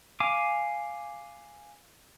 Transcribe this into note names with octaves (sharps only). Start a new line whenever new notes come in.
F5 G#5 D6